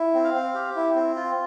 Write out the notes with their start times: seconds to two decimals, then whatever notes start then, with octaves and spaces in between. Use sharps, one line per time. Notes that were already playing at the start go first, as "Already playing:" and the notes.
Already playing: E4
0.14 C4
0.24 F5
0.34 C4
0.54 G4
0.76 E4
0.96 C4
1.16 F4